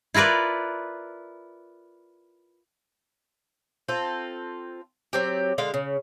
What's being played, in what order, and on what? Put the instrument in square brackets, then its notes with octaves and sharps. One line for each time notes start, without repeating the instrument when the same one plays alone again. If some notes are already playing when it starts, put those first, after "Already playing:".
[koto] E4 F4 A#4 B4 D5
[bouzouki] C4 F4 A4
F#3 C4 G4
D3 G#3 F5
C#3